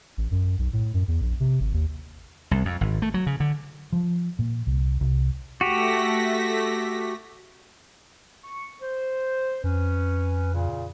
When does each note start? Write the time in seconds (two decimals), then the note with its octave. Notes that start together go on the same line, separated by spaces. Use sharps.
0.17 A1
0.31 F#2
0.58 B1
0.73 A2
0.94 F#2
1.08 E2
1.21 A#1
1.40 C3
1.60 G#1
1.73 D#2
2.51 C2
2.65 F2
2.81 G#1
3.02 A3
3.14 F#3
3.27 C#3
3.40 D3
3.92 F3
4.39 A#2
4.67 C2
5.01 C2
5.61 A3 F#4 G4 A#6 B6
8.43 C#6
8.81 C5
9.64 F2 C#4 B4
10.54 A#2 C#3